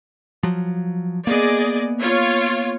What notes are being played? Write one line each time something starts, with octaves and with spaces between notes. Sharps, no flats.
F3 F#3
A#3 B3 G#4 D5 D#5
F4 C#5